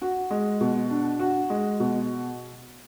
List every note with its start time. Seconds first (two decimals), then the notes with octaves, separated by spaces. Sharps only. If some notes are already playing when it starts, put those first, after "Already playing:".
0.02 F#4
0.30 G#3
0.61 B2
0.90 D4
1.19 F#4
1.50 G#3
1.80 B2